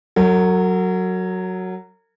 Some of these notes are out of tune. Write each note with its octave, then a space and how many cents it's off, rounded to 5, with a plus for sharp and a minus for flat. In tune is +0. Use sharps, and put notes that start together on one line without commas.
F#3 +0 A#4 -45